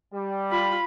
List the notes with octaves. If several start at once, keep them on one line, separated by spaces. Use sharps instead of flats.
G3
F4 B5